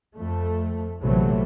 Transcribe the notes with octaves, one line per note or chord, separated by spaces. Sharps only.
F2 A3
A#1 C3 E3 F#3 A3